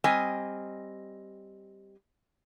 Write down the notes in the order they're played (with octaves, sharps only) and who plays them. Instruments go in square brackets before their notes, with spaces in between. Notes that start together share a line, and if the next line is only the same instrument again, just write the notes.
[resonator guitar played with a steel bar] G3 C4 D#5 G#5